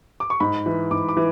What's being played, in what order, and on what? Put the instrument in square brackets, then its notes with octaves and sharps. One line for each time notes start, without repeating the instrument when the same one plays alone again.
[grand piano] D6
C#6
G#2 B5
E3
G#2 D6
D6
E3